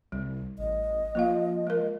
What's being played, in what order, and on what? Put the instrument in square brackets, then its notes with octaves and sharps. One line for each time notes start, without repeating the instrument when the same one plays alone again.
[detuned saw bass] C2 [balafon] G3
[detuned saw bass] A1 [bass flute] D#5
[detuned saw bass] F3 [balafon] A#3 F4 F5
[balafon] G#3 A#4